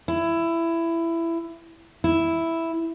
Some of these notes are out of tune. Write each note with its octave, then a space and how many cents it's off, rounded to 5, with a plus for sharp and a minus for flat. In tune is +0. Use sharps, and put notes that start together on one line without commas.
E4 +15
E4 +0